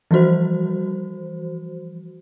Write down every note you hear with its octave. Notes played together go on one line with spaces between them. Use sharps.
E3 F3 G3 F#4 C5